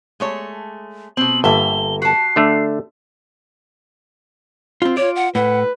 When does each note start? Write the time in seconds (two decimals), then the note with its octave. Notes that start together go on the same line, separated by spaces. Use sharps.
0.20 G#3 A3 C#5
1.17 B2 C4 F#7
1.44 G1 A#3 E5 A5 G7
2.02 F#4 A5 C7
2.36 D3 A3 D4
4.82 C4 F4
4.97 F4 C#5 D5
5.16 F#5
5.35 A2 B4 F#5